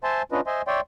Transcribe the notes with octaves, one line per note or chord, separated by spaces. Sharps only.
C5 E5 G#5 A5 C6
C#4 D4 F4 B4 D#5
C5 D#5 E5 G#5 C6
C#5 D5 E5 G5 C6